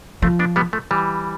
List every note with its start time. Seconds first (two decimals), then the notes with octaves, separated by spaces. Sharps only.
0.22 F3 A3 C4
0.39 B3 D4
0.56 G3 B3
0.73 F3 A3
0.91 E3 G3